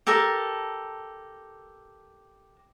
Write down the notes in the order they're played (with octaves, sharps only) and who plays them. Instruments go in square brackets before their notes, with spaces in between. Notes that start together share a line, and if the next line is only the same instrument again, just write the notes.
[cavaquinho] G4 A4 A#4